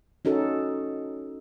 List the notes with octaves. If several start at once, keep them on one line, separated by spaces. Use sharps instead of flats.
C#4 D#4 F#4 A4